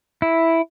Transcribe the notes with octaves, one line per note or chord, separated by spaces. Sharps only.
E4